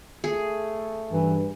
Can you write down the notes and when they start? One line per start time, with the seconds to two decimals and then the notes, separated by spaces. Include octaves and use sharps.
0.24 A3 G#4
1.11 G2 E3